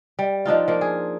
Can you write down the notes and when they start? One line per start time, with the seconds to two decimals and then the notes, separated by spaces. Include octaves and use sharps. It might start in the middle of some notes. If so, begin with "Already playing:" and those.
0.19 G3
0.46 F3 D4 D#4 F4
0.68 F3 A#3
0.81 G#4